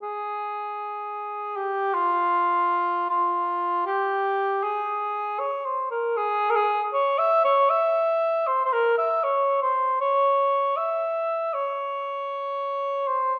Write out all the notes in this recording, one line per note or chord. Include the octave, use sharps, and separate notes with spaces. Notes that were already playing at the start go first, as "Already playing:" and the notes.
G#4
G4
F4
F4
G4
G#4
C#5
C5
A#4
G#4
A#4
G#4
C#5
E5
C#5
E5
C5
C5
A#4
E5
C#5
C5
C#5
E5
C#5
C5